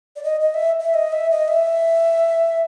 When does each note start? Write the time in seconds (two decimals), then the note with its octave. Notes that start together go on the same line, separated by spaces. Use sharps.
0.16 D5
0.23 D#5
0.40 D#5
0.54 E5
0.81 E5
0.94 D#5
1.12 E5
1.31 D#5
1.48 E5